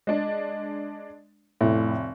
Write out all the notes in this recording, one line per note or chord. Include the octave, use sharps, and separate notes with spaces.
G#3 D4
F1 A2